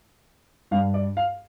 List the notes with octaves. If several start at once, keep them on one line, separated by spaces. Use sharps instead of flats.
G2 G3 F5
D5
F5